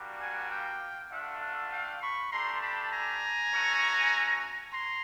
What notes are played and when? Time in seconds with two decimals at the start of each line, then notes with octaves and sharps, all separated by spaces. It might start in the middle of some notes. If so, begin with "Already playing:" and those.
Already playing: G3 A#3 D4 F#4
0.20 F#5 G#5
0.51 F5 G5
1.11 A3 D4 F4 E5 F#5
1.41 E5 F#5
1.71 F5 G5
2.02 B5 C#6
2.32 A3 D4 G4 A#5 C6
2.62 A5 B5
2.92 G#5 A#5
3.53 A3 C#4 F#4
4.74 A#5 C6